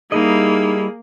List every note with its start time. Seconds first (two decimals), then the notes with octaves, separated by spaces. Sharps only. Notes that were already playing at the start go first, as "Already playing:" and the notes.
0.12 G3 A#3 D#4 E4 G#4 D#5